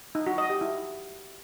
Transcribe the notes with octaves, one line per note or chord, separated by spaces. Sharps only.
D#4
F#4
D#5
G4
E4